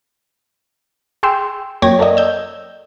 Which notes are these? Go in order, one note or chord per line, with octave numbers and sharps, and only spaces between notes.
G#4 G5 C6 E6
F#2 A#3 C#5 G5 G#6 A#6
A4 A#4 D5 D#5
E6 G6